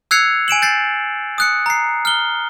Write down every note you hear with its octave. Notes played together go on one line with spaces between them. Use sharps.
E6 F#6 G#6 C7 C#7 F7
G#5 D7 E7 F#7
G6 A6 C7
D#6 F#6 C#7
A#5 C7
F6 G7